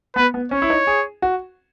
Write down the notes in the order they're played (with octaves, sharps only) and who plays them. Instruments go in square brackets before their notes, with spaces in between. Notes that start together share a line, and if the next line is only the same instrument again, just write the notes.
[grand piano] B3 [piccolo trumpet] B4
[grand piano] B3
[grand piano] C#4 [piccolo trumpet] C#5
[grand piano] E4
D#4
G#4
F#4